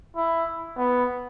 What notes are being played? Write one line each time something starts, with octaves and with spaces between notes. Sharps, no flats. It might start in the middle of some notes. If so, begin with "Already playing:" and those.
E4
B3